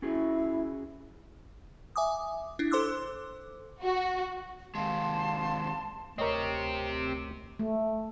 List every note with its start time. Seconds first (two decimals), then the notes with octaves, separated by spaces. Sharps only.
0.02 C#4 E4 F#4 G#4
1.96 E5 G#5 D6 D#6
2.59 D4 E4
2.71 A4 C5 C6 D6 E6 F#6
3.82 F#4
4.75 D#2 G#3 F5 A5 C6
6.18 D2 C4 G4 A#4 C#5 D#5
7.59 A3